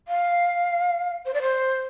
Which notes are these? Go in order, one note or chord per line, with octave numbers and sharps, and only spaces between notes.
F5
C5
D5
C5